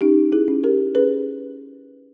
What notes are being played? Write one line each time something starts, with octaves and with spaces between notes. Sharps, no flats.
C#4 D#4 G4
E4 G#4
C#4
G4 A#4
C#4 G#4 B4